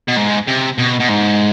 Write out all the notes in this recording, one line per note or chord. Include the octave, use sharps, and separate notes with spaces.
B2
G#2
C3
B2
B2
G#2